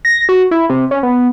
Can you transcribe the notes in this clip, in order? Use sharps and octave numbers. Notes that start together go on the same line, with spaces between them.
A#6
F#4
E4
C3
C#4
B3